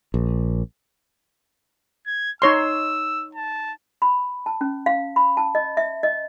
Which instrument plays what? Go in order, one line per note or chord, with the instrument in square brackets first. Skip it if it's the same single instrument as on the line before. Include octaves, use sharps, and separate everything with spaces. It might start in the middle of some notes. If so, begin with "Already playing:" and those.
[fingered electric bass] A#1
[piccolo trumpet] G#6
[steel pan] D#4 C#5 C6 [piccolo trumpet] E6
[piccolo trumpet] A5
[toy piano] B5
A5
C#4
F5
B5
A5
D#5
E5
D#5